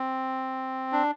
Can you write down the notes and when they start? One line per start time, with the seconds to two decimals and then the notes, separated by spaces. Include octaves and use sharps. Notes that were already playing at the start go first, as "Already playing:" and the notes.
Already playing: C4
0.92 D4